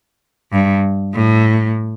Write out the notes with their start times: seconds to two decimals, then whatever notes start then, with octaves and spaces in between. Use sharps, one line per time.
0.52 G2
1.14 A2